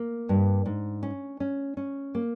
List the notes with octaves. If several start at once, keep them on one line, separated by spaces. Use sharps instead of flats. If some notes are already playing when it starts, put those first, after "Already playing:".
Already playing: A#3
G2
G#2
C#4
C#4
C#4
A#3